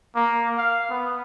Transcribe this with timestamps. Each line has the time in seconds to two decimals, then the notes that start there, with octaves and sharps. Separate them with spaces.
0.15 A#3
0.58 F5
0.90 B3